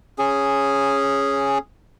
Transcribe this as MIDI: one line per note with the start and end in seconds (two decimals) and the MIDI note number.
0.19 1.58 61
0.19 1.58 68